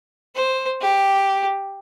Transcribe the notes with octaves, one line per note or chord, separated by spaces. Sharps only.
C5
G4